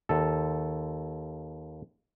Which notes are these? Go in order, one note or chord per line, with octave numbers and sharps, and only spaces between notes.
D#2 A4